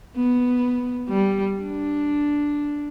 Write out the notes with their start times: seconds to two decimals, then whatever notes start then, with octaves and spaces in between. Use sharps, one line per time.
0.16 B3
1.08 G3
1.60 D4